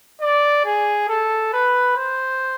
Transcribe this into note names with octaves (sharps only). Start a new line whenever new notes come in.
D5
G#4
A4
B4
C5